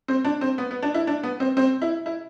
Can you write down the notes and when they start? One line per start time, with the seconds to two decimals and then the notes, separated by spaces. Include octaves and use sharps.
0.08 C4
0.25 D4
0.41 C4
0.58 B3
0.71 B3
0.82 D4
0.94 E4
1.07 D4
1.23 B3
1.40 C4
1.57 C4
1.82 E4
2.06 E4